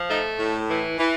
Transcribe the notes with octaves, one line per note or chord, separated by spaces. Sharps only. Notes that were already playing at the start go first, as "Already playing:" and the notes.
Already playing: F3
A3 D#4
A2
E3
E3